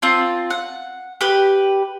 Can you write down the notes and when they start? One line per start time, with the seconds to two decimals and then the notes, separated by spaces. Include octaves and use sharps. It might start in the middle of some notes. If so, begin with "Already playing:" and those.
0.02 C4 F4 A5
0.50 F#5
1.21 G4 B4